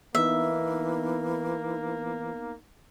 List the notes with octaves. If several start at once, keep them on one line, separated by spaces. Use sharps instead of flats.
E3 A#3 B3 D#4 E5